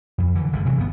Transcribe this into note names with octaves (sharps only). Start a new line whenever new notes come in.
F2
D3 E3
G#1 G2 D3
C3 E3 F#3
G1 B2 B3